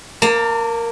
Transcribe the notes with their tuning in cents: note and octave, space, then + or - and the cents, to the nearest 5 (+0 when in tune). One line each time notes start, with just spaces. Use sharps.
A#3 +0 A5 +40